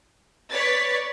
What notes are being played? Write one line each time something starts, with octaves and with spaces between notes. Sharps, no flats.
B4 C#5 D5 A6 B6